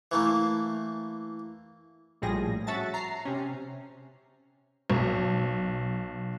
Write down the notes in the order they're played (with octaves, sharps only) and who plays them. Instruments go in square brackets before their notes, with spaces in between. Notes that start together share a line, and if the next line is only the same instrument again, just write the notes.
[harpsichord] E3 A3 A#3
[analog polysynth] A#1 A2 F3 G3 G#4 A#6
C#4 F#4 E5 A5 A6
A#5 C7
C3 C#4
[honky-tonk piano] B1